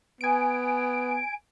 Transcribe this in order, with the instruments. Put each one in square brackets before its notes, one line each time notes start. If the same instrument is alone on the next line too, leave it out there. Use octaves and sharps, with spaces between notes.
[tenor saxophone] B3 [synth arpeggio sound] G#5 D7